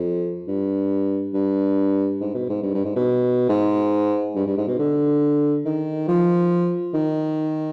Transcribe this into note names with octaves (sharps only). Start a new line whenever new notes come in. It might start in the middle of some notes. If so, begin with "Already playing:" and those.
Already playing: F2
G2
G2
G#2
B2
G#2
G2
G2
G#2
B2
G#2
G2
G2
G#2
B2
D3
D#3
F3
D#3